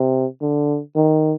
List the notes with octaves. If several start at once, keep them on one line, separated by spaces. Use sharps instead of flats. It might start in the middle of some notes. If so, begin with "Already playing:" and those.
Already playing: C3
D3
D#3